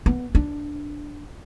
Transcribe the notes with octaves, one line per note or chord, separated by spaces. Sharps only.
B3
D4